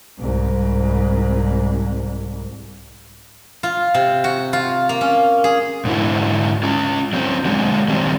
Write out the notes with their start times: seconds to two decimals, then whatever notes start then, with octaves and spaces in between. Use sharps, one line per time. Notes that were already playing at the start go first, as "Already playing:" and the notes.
0.19 C2 G#2
3.63 F4
3.94 C3
4.24 F#4
4.53 F4
4.89 A#3
5.01 C#4
5.44 G#4
5.85 G#2 D3 C#4 E4 F#4
6.63 C#4 F4
7.13 F#3 C4
7.45 D3 F#3 G#3
7.88 D#3 F#3 G3 C4